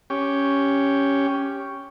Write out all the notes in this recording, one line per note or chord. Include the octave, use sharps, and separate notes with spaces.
C#4 G4